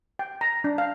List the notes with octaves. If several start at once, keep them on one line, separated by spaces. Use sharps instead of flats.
G5
A#5
D4
F5